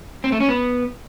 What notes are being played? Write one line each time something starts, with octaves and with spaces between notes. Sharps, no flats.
C4
A3
C#4
B3